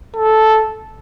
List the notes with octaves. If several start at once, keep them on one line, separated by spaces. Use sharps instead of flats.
A4